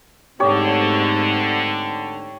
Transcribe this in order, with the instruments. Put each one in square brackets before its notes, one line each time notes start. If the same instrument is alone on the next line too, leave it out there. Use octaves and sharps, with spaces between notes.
[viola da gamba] G#2 A3 C4 [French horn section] D3 [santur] G4 C#5